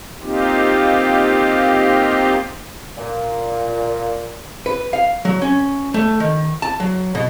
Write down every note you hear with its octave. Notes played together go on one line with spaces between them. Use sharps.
A#3 C4 D#4 F4 G4
A#2
B4
F5
F#3
C#4
A3
D#3
A5
F#3
B2